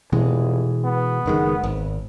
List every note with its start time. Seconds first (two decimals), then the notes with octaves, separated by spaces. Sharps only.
0.12 F1 B2 E3 G#3
0.84 B3
1.26 F#1 D#3 G#3
1.64 G#1